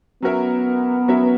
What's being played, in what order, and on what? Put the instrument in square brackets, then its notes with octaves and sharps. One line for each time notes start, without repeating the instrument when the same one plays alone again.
[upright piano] F#3 C#4 F#4 A#4 E5 [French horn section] B3
[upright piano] F#3 C#4 F#4 A#4 E5